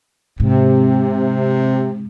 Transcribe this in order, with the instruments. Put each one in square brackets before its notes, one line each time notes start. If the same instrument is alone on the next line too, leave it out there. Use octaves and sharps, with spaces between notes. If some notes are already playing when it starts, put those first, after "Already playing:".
[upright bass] G#2 [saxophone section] C3